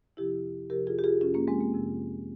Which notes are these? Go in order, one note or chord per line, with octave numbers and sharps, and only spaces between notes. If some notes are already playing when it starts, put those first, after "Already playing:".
F2 C3 F3 E4 G4
F2 C3 F3 G4 A#4
F4 G#4
G4
F4 G#4
F2 C3 F3 C#4 F4
A#3 C#4
G#3 C4
A#3
F2 C3 F3